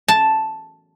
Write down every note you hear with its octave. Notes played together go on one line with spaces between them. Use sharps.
A5